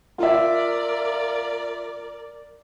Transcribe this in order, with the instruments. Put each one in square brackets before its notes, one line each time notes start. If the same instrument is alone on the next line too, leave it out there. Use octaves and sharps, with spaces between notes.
[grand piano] F4 E5 [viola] A#4 D5